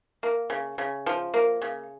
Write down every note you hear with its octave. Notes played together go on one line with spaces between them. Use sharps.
A#3
C#3
C#3
F3
A#3
C#3